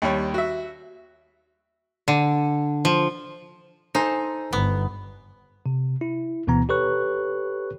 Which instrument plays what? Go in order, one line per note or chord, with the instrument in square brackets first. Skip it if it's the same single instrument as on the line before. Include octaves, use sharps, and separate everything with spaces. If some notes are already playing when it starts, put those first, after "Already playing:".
[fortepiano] D#2 G3 C#5
F#4 E5
[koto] D3
F3
[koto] D#4 [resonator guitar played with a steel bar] A4 C5 G#5
[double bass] G1 [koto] B3
[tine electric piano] C3
E4
D2 B2 E3 B3 A#5
G4 A4 B4 C#5 C#6 F#6